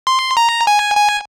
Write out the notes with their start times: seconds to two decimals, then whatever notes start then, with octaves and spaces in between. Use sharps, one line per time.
0.07 C6
0.37 A#5
0.67 G#5
0.97 G#5